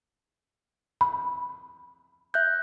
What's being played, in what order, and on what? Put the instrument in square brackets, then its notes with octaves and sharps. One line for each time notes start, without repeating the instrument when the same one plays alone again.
[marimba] B5
[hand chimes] E5 F#6 G6